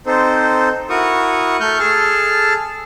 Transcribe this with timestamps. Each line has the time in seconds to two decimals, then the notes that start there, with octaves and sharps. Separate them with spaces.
0.07 C4 D#4 A4 C5
0.90 E4 F#4 A#4 C#6 D#6
1.60 A3 C#6 F6 G6
1.79 G#4 A4 A5 F6